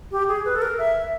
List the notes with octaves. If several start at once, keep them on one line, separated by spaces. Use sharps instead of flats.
G4
G#4
B4
A4
A#4
E5